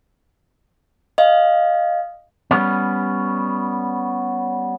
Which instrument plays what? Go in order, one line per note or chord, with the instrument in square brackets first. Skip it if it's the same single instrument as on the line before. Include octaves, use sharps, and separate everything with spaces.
[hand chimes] D#5 F5
[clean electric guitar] G3 B3 C#4